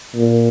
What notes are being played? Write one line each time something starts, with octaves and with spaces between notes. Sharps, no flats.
A#2